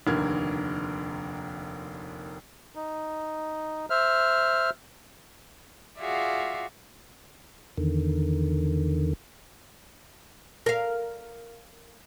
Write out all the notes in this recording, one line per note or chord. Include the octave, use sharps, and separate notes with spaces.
F1 D#2 D3 A#4 G#6
D#4
C5 E5 F6
F4 F#4 G#4 D5 E5 F5
E2 D3 D#3
A#4 F5